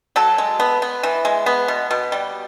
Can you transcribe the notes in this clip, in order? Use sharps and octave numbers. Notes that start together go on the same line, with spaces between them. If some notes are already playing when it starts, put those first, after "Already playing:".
F#3 A4
G#3
B3
B3
E3
G#3
B3
B2
B2
G3